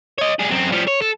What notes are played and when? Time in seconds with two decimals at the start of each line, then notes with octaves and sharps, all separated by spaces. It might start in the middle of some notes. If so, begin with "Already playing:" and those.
0.18 C#5 D#5
0.39 G3 G#4
0.51 F#2 C4
0.72 F3 G3
0.88 C#5
1.02 A4